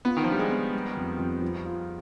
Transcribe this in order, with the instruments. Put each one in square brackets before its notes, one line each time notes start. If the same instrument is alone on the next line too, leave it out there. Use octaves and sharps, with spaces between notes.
[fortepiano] B3 [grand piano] F4
[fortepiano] D#3
F3
[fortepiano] G3 [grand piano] D4
[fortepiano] G#3
[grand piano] B3
G3
F2
F2
F3
F4